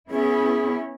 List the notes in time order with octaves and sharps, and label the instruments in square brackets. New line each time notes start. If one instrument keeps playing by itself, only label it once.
[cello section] B3 C#4 E4 [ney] G#4